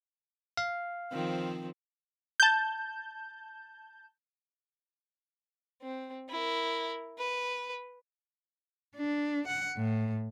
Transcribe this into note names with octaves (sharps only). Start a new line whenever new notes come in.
F5
D#3 F3 C4
A5 G6
C4
E4 A#4
B4
D4
F#5
A2